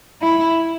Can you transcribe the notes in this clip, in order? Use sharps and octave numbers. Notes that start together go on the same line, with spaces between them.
E4